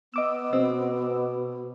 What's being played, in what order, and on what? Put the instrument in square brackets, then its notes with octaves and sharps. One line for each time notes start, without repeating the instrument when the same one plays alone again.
[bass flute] B3 [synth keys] D#5 D6 E6
[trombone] B2 [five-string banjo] C4